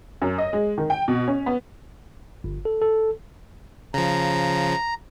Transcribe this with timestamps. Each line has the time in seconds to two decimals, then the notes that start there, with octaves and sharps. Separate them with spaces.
0.22 F#2
0.38 D#5
0.53 G#3
0.78 D#3
0.90 G5
1.08 B2
1.28 C#4
1.46 B3
2.44 G1
2.65 A4
2.82 A4
3.94 C#3 F3 A#5